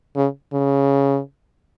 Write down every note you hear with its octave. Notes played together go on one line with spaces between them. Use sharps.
C#3
C#3